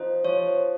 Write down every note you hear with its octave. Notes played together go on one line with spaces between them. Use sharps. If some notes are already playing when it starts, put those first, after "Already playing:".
Already playing: F3 D#4 C5
F3 C#5
C5